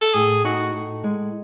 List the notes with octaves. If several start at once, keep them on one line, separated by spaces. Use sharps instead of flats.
A4
A2 G#4
D#4 F#4
A2
G#3